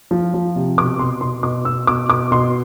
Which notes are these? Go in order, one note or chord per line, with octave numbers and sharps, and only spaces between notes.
F3
F3
C3
B2 D6
B2 C6
B2 C6
B2 D6
B2 E6
B2 D6
B2 D6
B2 C6